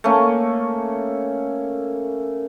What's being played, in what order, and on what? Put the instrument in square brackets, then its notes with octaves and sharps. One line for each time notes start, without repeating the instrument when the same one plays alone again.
[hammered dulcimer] A3 A#3 C#4